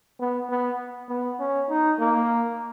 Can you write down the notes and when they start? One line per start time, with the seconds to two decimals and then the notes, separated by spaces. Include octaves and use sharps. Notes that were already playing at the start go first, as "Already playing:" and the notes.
0.20 B3
0.50 B3
1.09 B3
1.40 C#4
1.70 D#4
1.99 A#3